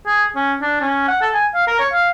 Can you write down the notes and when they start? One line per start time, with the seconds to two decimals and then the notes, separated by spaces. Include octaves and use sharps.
0.07 G#4
0.36 C#4
0.62 D4
0.81 C#4
1.08 F#5
1.22 A4
1.34 G#5
1.54 F5
1.67 A#4
1.79 C#5
1.93 F5